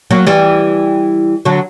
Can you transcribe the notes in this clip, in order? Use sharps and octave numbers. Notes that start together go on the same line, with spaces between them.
F#3 A#3
E3 G3
D3 F#3